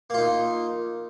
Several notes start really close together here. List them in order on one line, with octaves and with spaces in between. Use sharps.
A#3 F4 D#4